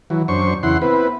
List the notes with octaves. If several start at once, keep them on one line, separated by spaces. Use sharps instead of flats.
E3 F#3
F#2 D4 C5 C#6
E2 C#3 E4 F#5 C6
B3 C4 E4 B4